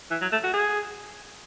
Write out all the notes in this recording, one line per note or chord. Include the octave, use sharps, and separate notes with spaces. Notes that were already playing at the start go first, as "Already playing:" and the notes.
E3
F#3
A3
F#4
G#4